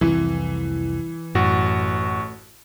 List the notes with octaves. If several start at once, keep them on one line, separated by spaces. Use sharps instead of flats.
C2 F2 E3
A1 F#2 A2 F#4